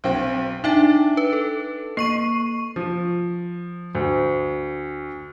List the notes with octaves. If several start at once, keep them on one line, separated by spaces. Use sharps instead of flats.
B1 C4
D4 D#4 E5 G5
B4
A4
A#3 C#6 C7 D#7
F3
D2